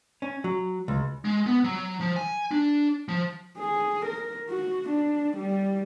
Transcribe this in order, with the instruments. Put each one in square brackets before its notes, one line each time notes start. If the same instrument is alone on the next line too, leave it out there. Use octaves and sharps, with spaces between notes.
[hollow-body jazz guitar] C#4
F#3
C#2
[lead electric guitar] G#3
B3
F#3
F3
G#5
D4
F3
[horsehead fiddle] G#4
A#4
F#4
D4
G3